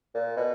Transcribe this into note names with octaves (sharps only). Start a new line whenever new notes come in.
A#2
B2